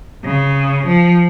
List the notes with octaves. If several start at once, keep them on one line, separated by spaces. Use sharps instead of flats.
C#3
F3